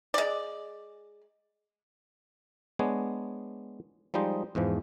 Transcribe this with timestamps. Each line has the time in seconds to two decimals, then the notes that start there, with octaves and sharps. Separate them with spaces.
0.14 G#3 D5
2.79 G#3 B3 D4 C#5
4.14 F3 G3 G#3 D#4 C5 D#5
4.55 E2 G#2 E3 F3